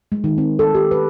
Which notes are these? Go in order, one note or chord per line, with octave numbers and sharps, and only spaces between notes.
G#3
D#3
C4
A4
G4
B4